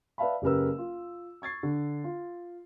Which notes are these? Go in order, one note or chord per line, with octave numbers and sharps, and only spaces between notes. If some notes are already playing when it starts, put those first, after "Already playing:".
B4 D5 E5 F5 A5 B5
F#1 C#3 G4 A#4 B4 E6
F4
C#6 G#6 A6 C7
D3
F4